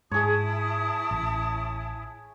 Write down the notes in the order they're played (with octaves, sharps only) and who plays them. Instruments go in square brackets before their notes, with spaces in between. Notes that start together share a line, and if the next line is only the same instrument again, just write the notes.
[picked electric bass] G#2 [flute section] E4 A5 D#6 [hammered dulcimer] G#4 C#5
[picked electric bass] A1